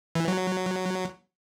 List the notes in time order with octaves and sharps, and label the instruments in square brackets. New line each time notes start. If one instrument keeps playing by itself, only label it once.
[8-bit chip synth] E3
F#3